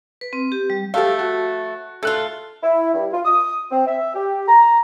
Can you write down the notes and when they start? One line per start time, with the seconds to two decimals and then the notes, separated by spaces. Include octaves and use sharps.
0.21 B4
0.33 C4
0.52 G4
0.70 G3
0.94 F3 A3 G4 A4 F5
1.19 F#4
2.03 A3 F4 A4 F#6
2.62 E4
2.94 G2
3.13 F4
3.25 D#6
3.71 C4
3.86 E5
4.14 G4
4.47 A#5